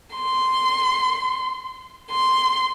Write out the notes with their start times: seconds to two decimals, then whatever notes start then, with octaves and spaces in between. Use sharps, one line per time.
0.18 C6
2.10 C6